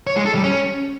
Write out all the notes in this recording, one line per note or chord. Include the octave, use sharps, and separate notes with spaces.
C#5
G#3
A4
G3
C#4